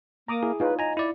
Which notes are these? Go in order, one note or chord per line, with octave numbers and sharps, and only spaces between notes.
A#3 A#5 D6 D#6
E4 G#4
D#4 F4 B4 C#5
D#5 G#5 A#5
E4 D5